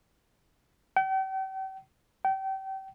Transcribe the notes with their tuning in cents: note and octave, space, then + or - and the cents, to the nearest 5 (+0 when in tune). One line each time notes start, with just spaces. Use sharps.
G5 -40
G5 -30